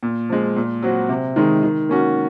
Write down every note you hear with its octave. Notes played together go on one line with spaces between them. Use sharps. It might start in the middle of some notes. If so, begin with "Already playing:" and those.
A#2
F3 G#3
A#2
F#3 C4 F#4
C3
D#3 G#3 D#4
D#3
A#3 C#4 F#4